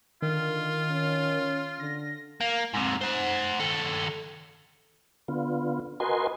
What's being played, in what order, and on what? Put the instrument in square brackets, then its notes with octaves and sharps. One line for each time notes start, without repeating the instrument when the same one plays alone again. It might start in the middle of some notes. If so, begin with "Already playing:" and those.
[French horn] D3 [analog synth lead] D#3 [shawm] F4
[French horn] C#4
[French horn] D3 [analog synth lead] A#6
[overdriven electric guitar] A#3
G#2 C3
C5 F#5
D#3 A4
[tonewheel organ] D3 B3 F4
F#4 A#4 B4 D#5 G#5 C6